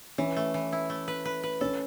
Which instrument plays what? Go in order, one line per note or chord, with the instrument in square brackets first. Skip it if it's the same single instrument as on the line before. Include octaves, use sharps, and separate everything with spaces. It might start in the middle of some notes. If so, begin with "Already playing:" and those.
[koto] E3 [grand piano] C#4
[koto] A3
E3
E4
A3
B4
B4
B4
[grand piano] C#4 [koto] A4